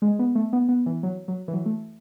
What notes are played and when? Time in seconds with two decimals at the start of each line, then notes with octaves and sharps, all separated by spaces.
0.02 G#3
0.19 B3
0.35 A3
0.53 B3
0.69 B3
0.86 E3
1.03 F#3
1.28 F#3
1.48 E3
1.53 F#3
1.66 A3